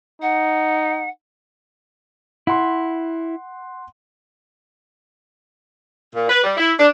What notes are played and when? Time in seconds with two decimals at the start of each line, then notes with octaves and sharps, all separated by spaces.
0.22 D#4 F#5
2.47 E4 F#5 C6
6.15 A#2
6.30 B4
6.43 G3
6.57 E4
6.78 D4